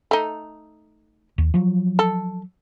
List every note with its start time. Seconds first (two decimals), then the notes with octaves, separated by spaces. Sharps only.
0.11 A3 D#4
1.38 D#2
1.54 F3 F#3
1.99 A4